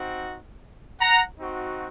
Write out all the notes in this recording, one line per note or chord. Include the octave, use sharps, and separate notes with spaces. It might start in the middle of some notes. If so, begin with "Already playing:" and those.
Already playing: C4 D#4 F#4
F#5 A#5
C4 D#4 F#4